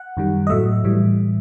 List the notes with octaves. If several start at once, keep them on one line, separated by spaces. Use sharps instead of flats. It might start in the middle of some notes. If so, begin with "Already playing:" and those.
Already playing: F#5
F#2 D#3 G3
D#5
A2 F#3 A3 E5
A2 E3 G3